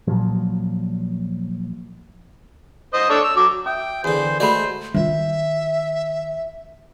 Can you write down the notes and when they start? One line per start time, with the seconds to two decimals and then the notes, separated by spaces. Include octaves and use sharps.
0.07 A#2 F3 F#3
2.94 C5 D#5
3.10 D4 A4 C#5
3.24 E6
3.36 F#3 D6
3.66 E5 G5 D#6
4.04 E2 D3 G#4 B4 C5
4.40 G#3 A3 F#4 C5 D5 B5
4.94 D#3 F4 E5